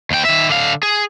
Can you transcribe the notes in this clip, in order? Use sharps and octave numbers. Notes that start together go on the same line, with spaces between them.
D#2 G5
D#3 E5
D3 F5
G#4